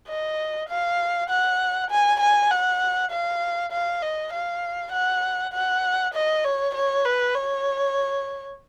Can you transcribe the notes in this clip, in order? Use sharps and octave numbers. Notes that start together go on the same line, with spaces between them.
D#5
F5
F#5
G#5
G#5
F#5
F5
F5
D#5
F5
F#5
F#5
D#5
C#5
C#5
B4
C#5